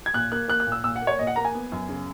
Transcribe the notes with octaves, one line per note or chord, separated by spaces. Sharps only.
G#6
A#2 F#6
A#3 F#6
A#3 F#6
F#6
A#2
E6
A#2 E6
F#5
A#3
C#5
A#2 D#5
F#5
A#3 A#5
G#5
B3
F#2
C#3